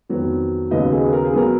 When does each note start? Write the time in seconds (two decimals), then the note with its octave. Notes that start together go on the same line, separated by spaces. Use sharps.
0.09 F2 D#3 F#3 B3
0.71 D#2 C#3 F#3 B3 B4 D#5
0.91 G#4 B4
1.13 A#4
1.25 G#4
1.33 F#3 B3 A#4